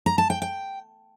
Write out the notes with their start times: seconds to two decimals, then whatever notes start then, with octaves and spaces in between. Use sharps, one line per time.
0.06 A#5
0.18 A5
0.30 G5
0.42 G5